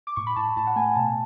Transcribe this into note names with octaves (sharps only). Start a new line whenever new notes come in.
D6
A2 C#6
B5
A2 A5
A2 A5
F#5
A3 G#5
B2 A5